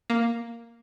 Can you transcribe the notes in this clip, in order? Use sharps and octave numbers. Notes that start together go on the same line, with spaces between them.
A#3